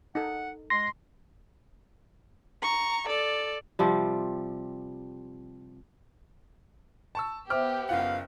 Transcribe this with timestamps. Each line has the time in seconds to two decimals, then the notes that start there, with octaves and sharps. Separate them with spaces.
0.15 D#4 A4 F#5
0.70 G#3 C6 A#6
2.62 A#5 C#6
3.07 A4 D5
3.79 C3 F3 G3
7.15 A5 C#6 E6
7.50 B3 G4 C5 E5 D6 F6
7.89 F#1 F4 F5 F#5